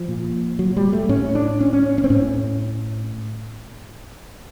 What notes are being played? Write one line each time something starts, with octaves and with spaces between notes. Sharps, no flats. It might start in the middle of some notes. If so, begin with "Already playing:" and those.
Already playing: F3
A#2
F#3
G3
A3
A2 C#4
D4
C#4
C#4
C#4
C4
A2 C#4